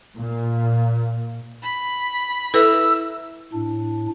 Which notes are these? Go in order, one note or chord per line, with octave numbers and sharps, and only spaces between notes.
A#2
B5
E4 A4 B4 E5 E6
A2 D4